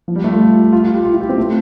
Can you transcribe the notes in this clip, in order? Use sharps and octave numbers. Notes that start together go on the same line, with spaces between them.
F3
G3
A3
F4
F4
F4
G4
F4
E4
G4
C4
A3